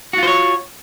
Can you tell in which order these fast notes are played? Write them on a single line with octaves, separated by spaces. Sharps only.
F#4 F4 C5 C#5